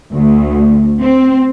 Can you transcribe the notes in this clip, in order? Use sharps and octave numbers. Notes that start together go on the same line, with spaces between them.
D2
C4